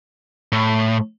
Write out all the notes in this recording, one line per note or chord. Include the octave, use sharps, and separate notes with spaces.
A2